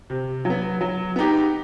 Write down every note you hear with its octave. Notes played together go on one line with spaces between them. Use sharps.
C3
F#3
B3
F#3
B3 D#4 G4